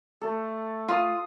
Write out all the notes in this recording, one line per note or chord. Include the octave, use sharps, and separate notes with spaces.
A3 A4
F4 F5 D#6